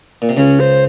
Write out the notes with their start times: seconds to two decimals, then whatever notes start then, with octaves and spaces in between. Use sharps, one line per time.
0.22 A#2
0.29 C3
0.36 C#2 C#3 C#4
0.60 C5